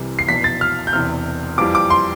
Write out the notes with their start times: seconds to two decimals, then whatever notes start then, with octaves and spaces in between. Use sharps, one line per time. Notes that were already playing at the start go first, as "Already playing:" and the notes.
Already playing: C2 C3 E3 G3
0.19 C7
0.28 F1 E2 B2 B6
0.44 A6
0.61 F6
0.87 G6
0.93 E1 E2 C3 F6
1.58 F2 E3 G3 D6
1.75 D6
1.90 C6